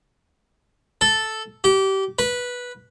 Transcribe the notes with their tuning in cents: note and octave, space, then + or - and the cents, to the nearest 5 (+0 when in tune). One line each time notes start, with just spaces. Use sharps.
A4 -5
G4 -25
B4 -10